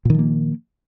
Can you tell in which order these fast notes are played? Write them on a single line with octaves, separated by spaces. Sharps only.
A#2 D#3 F3 A#3